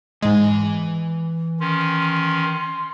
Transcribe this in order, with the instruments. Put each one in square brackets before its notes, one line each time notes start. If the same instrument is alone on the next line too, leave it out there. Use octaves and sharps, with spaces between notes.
[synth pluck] G#2 G#3 [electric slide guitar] E3 G#5
[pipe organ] D#3 C#4 [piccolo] C6